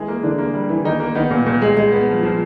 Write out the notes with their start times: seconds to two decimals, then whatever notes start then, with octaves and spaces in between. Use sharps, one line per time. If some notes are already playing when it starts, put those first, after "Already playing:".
Already playing: E3 G#3 G#4
0.08 A#3
0.23 D3 E3 D4
0.39 A#3
0.54 G3
0.69 E3
0.84 D#3 A#3 D#4
1.00 A#3
1.15 D#3 B3 D#4
1.31 A#2
1.46 A#2
1.62 G#3
1.77 G#3
1.92 B3
2.07 F3
2.23 F3